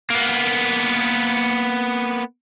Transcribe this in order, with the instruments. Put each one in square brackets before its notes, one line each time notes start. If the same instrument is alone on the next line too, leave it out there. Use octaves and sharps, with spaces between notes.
[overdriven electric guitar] A#3 B3